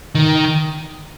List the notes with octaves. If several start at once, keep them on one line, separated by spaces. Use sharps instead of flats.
D#3